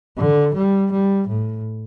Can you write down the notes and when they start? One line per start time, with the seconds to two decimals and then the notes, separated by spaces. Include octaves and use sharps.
0.18 D3
0.55 G3
0.91 G3
1.28 A2